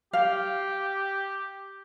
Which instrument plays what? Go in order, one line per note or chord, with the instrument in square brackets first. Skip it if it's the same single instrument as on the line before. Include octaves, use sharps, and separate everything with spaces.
[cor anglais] G4 [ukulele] F5